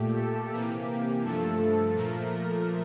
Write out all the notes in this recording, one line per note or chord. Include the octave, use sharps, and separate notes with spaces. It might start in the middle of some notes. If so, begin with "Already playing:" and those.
Already playing: A#2 A3 G4
A4
C3 E3 A#3 G4
G2 F3 A3 A4
A#2 F3 A3 A#4
A#4